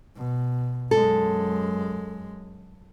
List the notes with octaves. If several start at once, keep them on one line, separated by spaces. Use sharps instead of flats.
B2
F#2 G#3 A4